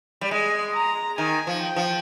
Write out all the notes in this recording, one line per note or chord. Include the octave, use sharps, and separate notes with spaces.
G3
G#3 G#5
A#5
D#3 G#5
F3
G5
F3